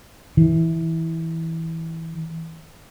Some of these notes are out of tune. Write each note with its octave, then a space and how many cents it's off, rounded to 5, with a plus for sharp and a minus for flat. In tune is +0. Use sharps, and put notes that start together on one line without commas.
E3 -15